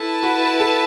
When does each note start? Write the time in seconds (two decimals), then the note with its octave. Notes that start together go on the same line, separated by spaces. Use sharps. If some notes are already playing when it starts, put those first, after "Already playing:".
Already playing: E4 A4 B4 A5
0.23 F#4
0.60 A4